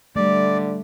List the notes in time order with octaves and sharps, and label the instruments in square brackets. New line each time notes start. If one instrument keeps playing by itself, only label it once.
[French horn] D3 [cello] G3 [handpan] A3 [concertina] D5